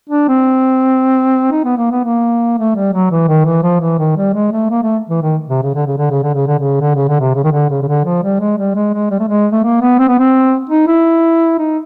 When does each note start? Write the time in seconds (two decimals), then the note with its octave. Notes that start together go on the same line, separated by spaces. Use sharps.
0.09 D4
0.28 C4
1.52 D#4
1.65 B3
1.77 A#3
1.91 B3
2.04 A#3
2.58 A3
2.76 G3
2.92 F#3
3.11 E3
3.28 D#3
3.45 E3
3.63 F3
3.81 E3
3.99 D#3
4.17 G3
4.34 G#3
4.52 A3
4.70 A#3
4.83 A3
5.09 E3
5.22 D#3
5.49 C3
5.62 C#3
5.75 D3
5.87 C#3
5.98 D3
6.10 C#3
6.23 D3
6.35 C#3
6.47 D3
6.59 C#3
6.81 D3
6.95 C#3
7.08 D3
7.20 C3
7.35 C#3
7.44 D#3
7.52 D3
7.70 C#3
7.82 C#3
7.88 D3
8.05 F3
8.23 G3
8.40 G#3
8.58 G3
8.75 G#3
8.94 G#3
9.10 G3
9.19 A3
9.28 G#3
9.52 A3
9.64 A#3
9.81 B3
9.99 C4
10.08 B3
10.19 C4
10.69 D#4
10.87 E4
11.59 D#4